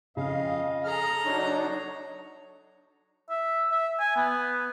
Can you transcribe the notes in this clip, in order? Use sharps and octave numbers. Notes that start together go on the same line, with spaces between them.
F2 C#3 D#5 F5
G#4 A4 A#5 F6
F#3 D4 D#4 C#5
E5
E5
G#5
B3